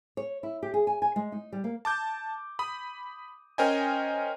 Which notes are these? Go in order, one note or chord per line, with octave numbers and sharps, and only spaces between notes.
C#5
E4
G4
G#4
G#5
G#5
G#3
D#4
G3
A#3
A5 D6 G6
B5 D#6
C#4 A#4 C5 D#5 G5 G#5